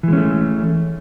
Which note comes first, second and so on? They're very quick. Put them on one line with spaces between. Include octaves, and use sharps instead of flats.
E3 G#3 C#4 A3